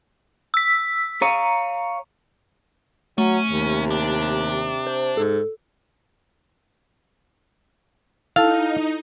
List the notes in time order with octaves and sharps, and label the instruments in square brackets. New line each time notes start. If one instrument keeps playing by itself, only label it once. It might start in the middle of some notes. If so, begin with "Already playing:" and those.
[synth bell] E6 B6
[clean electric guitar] C#5 F5 [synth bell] A#5
[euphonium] F#3 [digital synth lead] A3 [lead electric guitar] C#4
[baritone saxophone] D#2 [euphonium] C3
[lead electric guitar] D4
[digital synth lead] C5
[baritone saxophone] G#2 [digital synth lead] A4
[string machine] D#4 [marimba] E4 A4 A5 [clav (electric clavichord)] F5